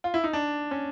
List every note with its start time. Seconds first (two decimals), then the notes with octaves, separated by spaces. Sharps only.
0.04 F4
0.14 E4
0.24 D#4
0.33 D4
0.71 C#4